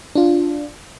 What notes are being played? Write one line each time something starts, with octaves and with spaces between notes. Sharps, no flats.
D4 F4